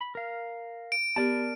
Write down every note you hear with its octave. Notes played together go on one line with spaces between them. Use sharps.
B5
A#4 F5
D7
B3 G4 A#4 D5 A5